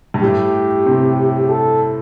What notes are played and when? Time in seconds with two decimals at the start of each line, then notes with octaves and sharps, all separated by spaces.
0.14 G2
0.22 A2 G4
0.86 C3
1.49 A4